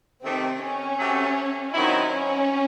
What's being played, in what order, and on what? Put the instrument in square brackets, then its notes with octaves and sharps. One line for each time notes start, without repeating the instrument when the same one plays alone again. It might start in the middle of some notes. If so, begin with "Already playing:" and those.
[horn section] C3 D#3 A3 [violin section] C4
[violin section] C#4
[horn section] C3 F#3 A3
[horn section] D#3 F#3 C4 E4 [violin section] D#4
[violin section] C#4